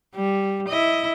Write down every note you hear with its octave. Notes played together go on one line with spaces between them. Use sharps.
G3
E4 D#5